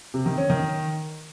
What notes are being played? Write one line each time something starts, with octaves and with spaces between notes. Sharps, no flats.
C3
D#3
C#4
D#3